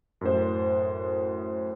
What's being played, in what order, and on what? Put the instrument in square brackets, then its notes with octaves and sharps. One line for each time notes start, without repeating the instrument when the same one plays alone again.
[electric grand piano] F#2 A2 C5